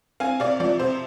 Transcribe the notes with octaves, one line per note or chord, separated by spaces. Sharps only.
C4 F5 G#5
C3 D5 F5
F3 D5
C3 C5